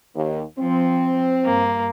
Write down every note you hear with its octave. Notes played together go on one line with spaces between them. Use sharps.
D#2
F3 C4
G2 A#3